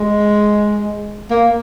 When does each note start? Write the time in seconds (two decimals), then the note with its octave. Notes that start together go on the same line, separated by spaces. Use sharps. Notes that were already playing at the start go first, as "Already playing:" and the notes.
Already playing: G#3
1.30 A#3